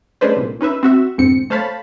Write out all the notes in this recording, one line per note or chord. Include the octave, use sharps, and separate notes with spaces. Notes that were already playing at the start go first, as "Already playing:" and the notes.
G#3 A3 C#4 D4 B4 C5
C2 A#2
C#4 D#4 B4 E5
C4 F#4 E5
B1 F2 G#2 D3 C4 C#7
A3 C5 C#5 F5 A5 B5